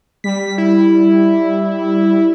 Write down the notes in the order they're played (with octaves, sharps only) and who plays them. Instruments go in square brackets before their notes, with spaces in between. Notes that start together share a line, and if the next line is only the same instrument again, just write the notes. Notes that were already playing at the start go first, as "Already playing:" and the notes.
[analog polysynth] G3 [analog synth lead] B6
[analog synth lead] E4